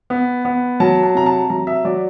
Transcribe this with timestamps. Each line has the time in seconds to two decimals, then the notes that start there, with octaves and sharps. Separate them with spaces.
0.10 B3
0.45 B3
0.80 F#3 A5
1.03 A5
1.15 C3 A#5
1.26 A5
1.50 F#3 A#5
1.67 E5
1.85 F#3 D5